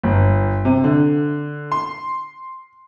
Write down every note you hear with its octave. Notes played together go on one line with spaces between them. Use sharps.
G1
C3
D3
C6